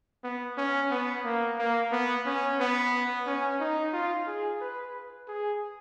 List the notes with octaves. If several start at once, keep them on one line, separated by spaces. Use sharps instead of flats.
B3
C#4
B3
A#3
A#3
B3
C#4
B3
C#4
D#4
F4
G#4
B4
G#4